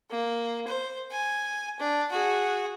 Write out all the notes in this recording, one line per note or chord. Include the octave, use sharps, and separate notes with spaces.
A#3
C5
G#5
D4
F#4 G#4